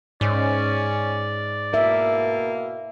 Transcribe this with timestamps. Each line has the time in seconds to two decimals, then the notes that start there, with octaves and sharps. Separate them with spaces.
0.21 G#2 C#4 D5
1.74 B2 A#3 E5